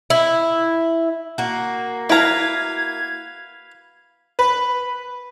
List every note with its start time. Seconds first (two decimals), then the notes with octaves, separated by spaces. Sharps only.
0.10 E4
1.38 A#3 F#4
2.10 E4 B4 F5 A#5 G#6
4.39 B4